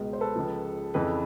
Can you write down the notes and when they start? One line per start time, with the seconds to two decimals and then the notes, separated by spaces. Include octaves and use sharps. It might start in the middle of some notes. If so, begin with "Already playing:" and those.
Already playing: C#2 B2 G#3
0.13 C5
0.20 A4 B4
0.36 C#2 C#3 F3
0.94 F2 C#3 E3 A4 B4